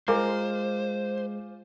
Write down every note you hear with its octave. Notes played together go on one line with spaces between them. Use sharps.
G#3 F4 A#4 C5 G#5 D6